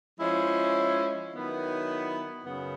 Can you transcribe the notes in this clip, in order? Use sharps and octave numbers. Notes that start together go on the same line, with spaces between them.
F3 G#3 C#4 E4
D#3 F#3 B3 E4
F#2 C#3 B3